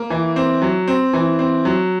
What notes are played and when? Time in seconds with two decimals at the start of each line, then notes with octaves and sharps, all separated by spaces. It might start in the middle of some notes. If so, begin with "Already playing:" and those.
Already playing: A#3
0.10 E3
0.36 C4
0.62 F#3
0.88 C4
1.13 E3
1.39 C4
1.65 F#3